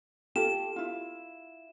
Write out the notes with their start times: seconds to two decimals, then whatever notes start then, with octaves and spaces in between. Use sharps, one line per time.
0.36 F4 G4 A4 E7
0.76 E4 F4